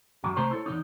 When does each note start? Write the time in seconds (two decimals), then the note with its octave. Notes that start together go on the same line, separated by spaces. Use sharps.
0.24 F#2 F#3
0.36 C2 A3 C5 A#5 C6
0.51 E4 A4 C#5
0.66 E2 B2 D#4